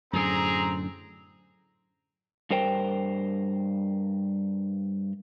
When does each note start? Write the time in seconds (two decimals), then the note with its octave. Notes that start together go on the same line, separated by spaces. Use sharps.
0.13 F#2 A2 D3 C4 G#4 A#5
2.50 G2 A#4 C5 G5